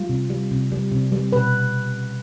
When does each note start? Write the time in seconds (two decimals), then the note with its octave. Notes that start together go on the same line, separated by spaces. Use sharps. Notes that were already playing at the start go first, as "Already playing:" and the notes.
Already playing: G3 F4
0.09 C3
0.30 G3
0.51 C3
0.72 G3
0.92 C3
1.12 G3
1.32 B2 B4